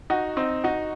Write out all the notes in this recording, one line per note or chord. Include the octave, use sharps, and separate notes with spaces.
D#4 F#4
C4 D#4
D#4 F#4